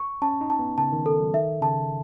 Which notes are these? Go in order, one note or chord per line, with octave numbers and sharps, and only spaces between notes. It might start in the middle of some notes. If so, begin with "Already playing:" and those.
Already playing: C#6
C#4 A5
D#4
A5
B3
C#3 A5
D#3
D#3 A4
F#3
D#3 E5
C#3 A5